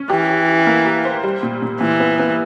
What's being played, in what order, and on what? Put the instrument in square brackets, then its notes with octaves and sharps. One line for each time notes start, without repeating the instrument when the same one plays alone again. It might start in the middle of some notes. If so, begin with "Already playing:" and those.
Already playing: [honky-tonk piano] C#4
[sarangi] E3 [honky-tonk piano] G4
[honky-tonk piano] G4
G4
A#3
G4
C5
G3
A#2
A#2
[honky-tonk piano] A#2 [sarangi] E3
[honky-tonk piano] B3
B3